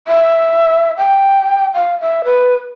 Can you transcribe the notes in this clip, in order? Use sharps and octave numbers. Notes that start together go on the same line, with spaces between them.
E5
G5
F5
E5
B4